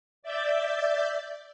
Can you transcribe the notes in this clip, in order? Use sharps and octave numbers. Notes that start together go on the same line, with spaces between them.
D5 E5 G6 A6